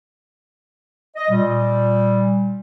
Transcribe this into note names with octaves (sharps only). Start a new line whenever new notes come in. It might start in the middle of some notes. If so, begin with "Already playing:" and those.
D#5
A#2 G3